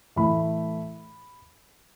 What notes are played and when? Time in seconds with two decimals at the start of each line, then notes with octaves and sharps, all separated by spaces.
0.16 A2 E3 A3 B5